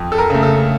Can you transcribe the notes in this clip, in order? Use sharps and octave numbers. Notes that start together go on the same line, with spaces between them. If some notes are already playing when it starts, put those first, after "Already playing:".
Already playing: F2
A4
A#4
C#3 A3
A4